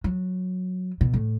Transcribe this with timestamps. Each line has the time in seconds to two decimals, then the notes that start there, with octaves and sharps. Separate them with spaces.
0.04 F#3
1.01 B2
1.13 A2